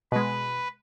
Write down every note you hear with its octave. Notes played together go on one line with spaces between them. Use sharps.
B2 G#3 B4